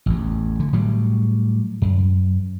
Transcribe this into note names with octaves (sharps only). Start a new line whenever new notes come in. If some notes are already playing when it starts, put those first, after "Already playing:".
A1 E2
D3
A2 F#3 G3
F#2